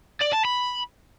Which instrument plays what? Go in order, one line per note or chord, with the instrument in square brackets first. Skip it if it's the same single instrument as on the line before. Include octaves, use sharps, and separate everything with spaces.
[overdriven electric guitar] D5
A5
B5